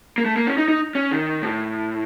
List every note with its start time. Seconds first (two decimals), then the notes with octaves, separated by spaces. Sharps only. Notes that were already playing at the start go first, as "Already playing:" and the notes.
0.18 A#3
0.25 A3
0.36 A#3
0.47 C#4
0.58 D#4
0.68 D#4
0.95 C#4
1.11 D#3
1.42 A2